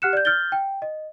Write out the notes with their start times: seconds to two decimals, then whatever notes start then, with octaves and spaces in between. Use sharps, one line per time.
0.02 G4 F#5 F6 F#6 C#7 E7
0.13 D5 G6
0.25 F6 G6 A6 G7
0.52 G5
0.82 D#5